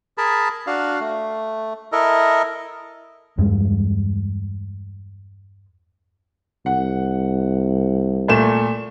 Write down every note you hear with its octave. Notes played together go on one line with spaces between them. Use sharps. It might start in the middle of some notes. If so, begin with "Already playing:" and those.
G#4 A#4 A5 B5
D4 F#4 F5
A3
E4 A4 A#4 D#5
E2 G2 G#3
C2 F#5
A#2 A3 E7